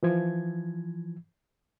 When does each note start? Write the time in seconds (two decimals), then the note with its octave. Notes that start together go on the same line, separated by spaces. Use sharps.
0.03 E3 F3 G#6